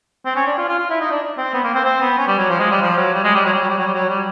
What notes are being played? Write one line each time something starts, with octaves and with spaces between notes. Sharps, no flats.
C4
C#4
D4
F4
F4
F4
E4
D#4
D4
C4
B3
A#3
C4
C4
B3
C#4
G3
F#3
F3
G#3
G3
F3
F#3
G3
G#3
G3
F#3
G3
F#3
G3
F#3
G3
F#3
G3